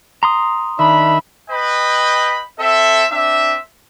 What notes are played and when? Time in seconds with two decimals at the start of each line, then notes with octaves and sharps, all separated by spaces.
0.23 A#5 C6 D#6
0.79 D#3 D4 E5 B5
1.51 B4 D#5 G5 B5
2.60 C4 A4 E5
3.11 C4 D4 E5